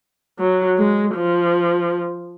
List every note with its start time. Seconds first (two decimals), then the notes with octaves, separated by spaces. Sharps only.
0.39 F#3
0.78 G#3
1.15 F3